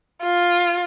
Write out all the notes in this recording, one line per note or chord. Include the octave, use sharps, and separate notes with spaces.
F4